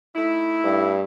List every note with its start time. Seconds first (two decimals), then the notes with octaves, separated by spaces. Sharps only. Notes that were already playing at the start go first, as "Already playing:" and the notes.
0.15 A3 D#4 E4
0.64 G2